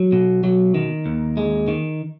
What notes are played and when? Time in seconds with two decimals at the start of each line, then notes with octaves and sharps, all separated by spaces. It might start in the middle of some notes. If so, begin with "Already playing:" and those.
Already playing: F#3
0.12 B2
0.44 F#3
0.75 D#3
1.06 D#2
1.37 G#3
1.68 D#3